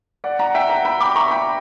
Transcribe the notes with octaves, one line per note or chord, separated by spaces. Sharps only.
D5 F#5
F#5 A#5
E5 G5
F#5 A#5
G5 B5
B5 D6
A#5 C#6
G5 B5